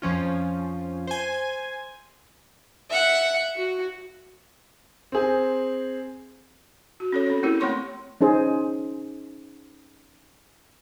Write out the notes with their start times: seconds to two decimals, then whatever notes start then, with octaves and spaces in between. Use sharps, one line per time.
0.02 F2 F3 C#4 F4
1.07 C5 G#5
2.90 E5 F#5
3.56 F#4
5.12 C4 G#4
7.00 F#4
7.12 C#4 A4 C#5
7.26 C4 C#5
7.43 A#3 E4 G4 A#4
7.60 A3 A#3 C4 C#5 C6 C#6
8.21 C#4 D#4 G#4 C5